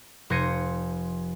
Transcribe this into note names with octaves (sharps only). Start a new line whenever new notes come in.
F1 C5 G#6 A#6 C#7 D#7